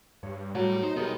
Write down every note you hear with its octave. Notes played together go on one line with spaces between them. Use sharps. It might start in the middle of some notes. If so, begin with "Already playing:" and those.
G2 C#5
A2 F#3 G3 A3
D#4 C5
B1 D#3 G3 G#3 B3